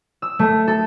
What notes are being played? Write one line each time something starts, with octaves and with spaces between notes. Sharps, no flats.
E6
A3
A4